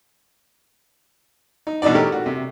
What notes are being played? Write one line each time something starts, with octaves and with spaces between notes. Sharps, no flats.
D#4
B2 E3 D4 D#4 D5
A3 C#4 G4 A4 A#4
F#4
C3